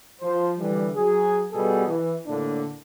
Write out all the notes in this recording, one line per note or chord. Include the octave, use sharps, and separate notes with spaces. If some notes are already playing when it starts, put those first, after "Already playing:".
F3 C5
D3 E3 G3
F#3 G#4
B2 G3 B3 G#4 A4
E3
A2 D3 A#3 D4